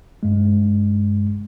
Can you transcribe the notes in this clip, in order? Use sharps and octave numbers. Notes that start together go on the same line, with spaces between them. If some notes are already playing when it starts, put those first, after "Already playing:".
G2 G#3